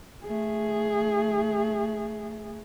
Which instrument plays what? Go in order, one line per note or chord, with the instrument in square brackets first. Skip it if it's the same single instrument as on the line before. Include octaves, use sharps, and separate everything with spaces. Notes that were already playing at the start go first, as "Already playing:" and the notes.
[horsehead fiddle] A3 G#4